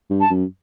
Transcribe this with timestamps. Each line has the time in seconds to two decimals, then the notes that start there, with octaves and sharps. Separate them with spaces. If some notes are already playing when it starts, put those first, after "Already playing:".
0.10 G2
0.20 A5
0.30 F#2